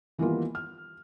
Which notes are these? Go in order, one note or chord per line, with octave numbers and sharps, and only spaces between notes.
D#3 E3 G3 A#3 B3 F4
F6